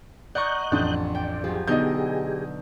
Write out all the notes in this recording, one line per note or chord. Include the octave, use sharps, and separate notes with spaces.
D5 D#5 F#5 A#5 C#6 F#6 G6
A1 F2 D4
D5 G5
F3 F#3 G4 G#4
B2 D3 D#4 D#5 G6